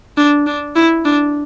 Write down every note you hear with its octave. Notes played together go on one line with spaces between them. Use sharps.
D4
D4
E4
D4